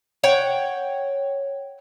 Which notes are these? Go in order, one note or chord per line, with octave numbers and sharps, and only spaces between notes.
C#5 F#5 G5